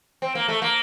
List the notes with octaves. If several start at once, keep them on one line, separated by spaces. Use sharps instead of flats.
C4
A#3
A3
A#3